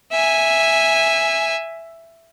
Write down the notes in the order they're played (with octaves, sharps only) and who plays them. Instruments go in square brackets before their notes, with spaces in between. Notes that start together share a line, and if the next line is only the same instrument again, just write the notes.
[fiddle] E5 G#5